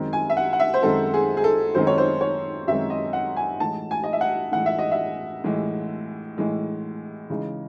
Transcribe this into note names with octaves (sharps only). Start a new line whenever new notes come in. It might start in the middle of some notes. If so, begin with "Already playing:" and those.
Already playing: F#2 D#3 G#3 C4
G#5
E5
F#5
F#5
E5
C5
F#2 D#3 G#3 C4 A4
G#4
G#4
A4
F#2 D#3 G#3 C4 C5
C#5
C5
C#5
F#2 D#3 G#3 C4 E5
D#5
F#5
G#5
A2 E3 G#3 A5
G#5
D#5
E5
F#5
A2 E3 G#3 F#5
E5
D#5
E5
A2 E3 G#3
A2 E3 G#3
C#3 E3 G#3 D#4